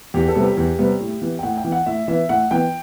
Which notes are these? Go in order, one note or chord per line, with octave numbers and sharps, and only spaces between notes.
E2 G4
A4
C3 G3 B3
G4
E2
C3 G3 B3
A2
E3 B3
G5
A2 F#5
G5
E3 B3
F#5
A2 E5
E3 B3 E5
A2 F#5
E3 B3 G5